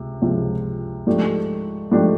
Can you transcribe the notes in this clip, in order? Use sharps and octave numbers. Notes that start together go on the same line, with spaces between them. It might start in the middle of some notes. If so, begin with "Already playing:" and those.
Already playing: C#2 C3
C#2 C3 F3
G#2 F3 A3 D4 G4
G#2 F3 A3 D4 G4